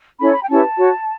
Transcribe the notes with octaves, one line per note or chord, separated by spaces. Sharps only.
C#4 E4 A4 C#5 B5
B5
G5
C#4 E4 G4 B4 A5
F#4 C#5